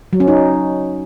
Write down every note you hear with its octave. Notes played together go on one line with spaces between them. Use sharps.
F#3
C#4
D#4